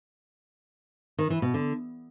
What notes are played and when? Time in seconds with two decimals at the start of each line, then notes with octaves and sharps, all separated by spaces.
1.18 D#3
1.30 E3
1.42 B2
1.54 D3